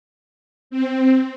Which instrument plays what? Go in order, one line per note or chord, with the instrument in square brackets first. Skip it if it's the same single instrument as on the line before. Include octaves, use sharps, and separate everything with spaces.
[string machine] C4